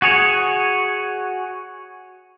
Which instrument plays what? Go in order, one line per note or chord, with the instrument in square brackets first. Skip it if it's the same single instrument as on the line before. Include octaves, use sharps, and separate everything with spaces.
[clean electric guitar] F#4 G#4 C#5